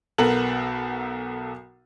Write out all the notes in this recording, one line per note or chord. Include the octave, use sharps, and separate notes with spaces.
B1 B3 A4 A#4 F#7